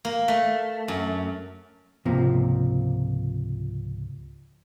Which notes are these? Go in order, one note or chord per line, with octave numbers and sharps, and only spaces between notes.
A#3
A3
F#2
C#2 G#2 C3 F3 A#3